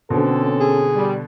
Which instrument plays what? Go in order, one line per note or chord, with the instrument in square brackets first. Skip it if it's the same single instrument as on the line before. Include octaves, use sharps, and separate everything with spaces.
[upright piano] B2 D3 [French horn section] C4 C#4 A4
[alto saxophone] G#4
[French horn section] G3